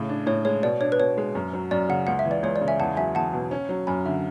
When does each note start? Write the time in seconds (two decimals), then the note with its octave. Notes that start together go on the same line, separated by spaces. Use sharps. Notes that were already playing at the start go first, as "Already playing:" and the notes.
Already playing: A2 C#3
0.09 D4
0.26 A2 C#5
0.45 G#3 C#5
0.63 B2 D5
0.81 D4 C#5
0.92 B4
0.99 B2 C#5
1.18 G#3
1.35 F#2
1.53 F#3
1.71 F#2 D5
1.89 C#3 F#5
2.07 C#2 F#5
2.19 E5
2.25 E3
2.31 D5
2.43 C#2 C#5
2.56 D5
2.61 C#3
2.68 E5 G#5
2.80 E2 F#5 A5
2.97 F#3 E5 G#5
3.15 E2 F#5 A5
3.33 B2
3.51 C#4
3.69 F#3
3.87 F#2 G#5 B5
4.05 D3 E5